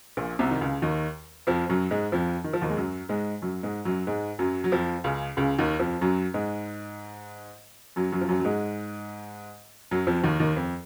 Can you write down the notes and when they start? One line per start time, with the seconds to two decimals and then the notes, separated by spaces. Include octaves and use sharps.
0.17 A#1 A#2
0.39 C2 C3
0.51 D#3
0.61 C#2 C#3
0.82 D#2 D#3
1.47 F2 F3
1.69 F#2 F#3
1.91 G#2 G#3
2.12 F2 F3
2.44 D#3
2.53 F3
2.62 D#2 D#3
2.70 G#3
2.77 F#2 F#3
3.09 G#2 G#3
3.42 F#2 F#3
3.63 G#2 G#3
3.85 F#2 F#3
4.07 G#2 G#3
4.39 F#2 F#3
4.64 F#3
4.72 F2 F3
5.04 C#2 C#3
5.37 C#2 C#3
5.59 D#2 D#3
5.79 F2 F3
6.01 F#2 F#3
6.34 G#2 G#3
7.96 F#2 F#3
8.12 F#2 F#3
8.21 F3
8.29 F#2 F#3
8.40 F#3
8.44 G#2 G#3
9.91 F#2 F#3
10.07 F2 F3
10.23 D#2 D#3
10.40 D#2 D#3
10.57 F2